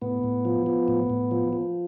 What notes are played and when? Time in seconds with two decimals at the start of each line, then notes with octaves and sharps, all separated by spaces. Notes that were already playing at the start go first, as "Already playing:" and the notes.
0.02 A2 B3
0.24 A2
0.45 F3
0.66 F3
0.88 A2
1.10 A2
1.31 F3
1.53 F3